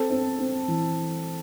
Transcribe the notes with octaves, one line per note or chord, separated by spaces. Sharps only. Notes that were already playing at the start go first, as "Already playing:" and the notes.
Already playing: C4 A4
C4
C4
E3